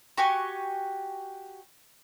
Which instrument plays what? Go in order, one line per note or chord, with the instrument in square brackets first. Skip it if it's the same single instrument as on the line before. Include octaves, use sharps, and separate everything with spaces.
[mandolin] F#4 G4 G#5 C#6